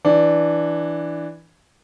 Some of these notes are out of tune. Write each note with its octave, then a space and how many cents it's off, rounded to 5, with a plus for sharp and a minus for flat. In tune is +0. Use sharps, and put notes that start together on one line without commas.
E3 +0 D4 +5